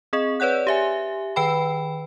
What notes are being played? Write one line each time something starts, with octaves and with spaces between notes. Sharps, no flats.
C4 G#4 D#5
B4 C#5 D5 F#5 F#6
G4 E5 G#5
D#3 B4 G5 B5